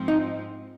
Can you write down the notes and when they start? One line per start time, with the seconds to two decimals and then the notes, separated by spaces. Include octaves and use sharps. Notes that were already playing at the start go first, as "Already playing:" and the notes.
Already playing: G#2 F3 C4
0.08 D#4